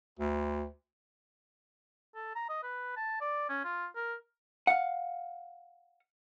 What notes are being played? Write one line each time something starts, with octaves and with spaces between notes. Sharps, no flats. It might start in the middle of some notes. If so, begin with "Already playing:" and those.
D2
A4
A#5
D#5
B4
A5
D5
C#4
F4
A#4
F5 F#5